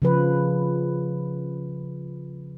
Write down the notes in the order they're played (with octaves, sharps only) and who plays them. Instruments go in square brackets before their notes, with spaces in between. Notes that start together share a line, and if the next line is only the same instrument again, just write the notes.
[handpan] C#3 F3 B4